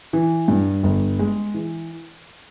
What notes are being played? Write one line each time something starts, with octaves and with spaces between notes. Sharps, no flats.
E3
G2
G1
G#3
E3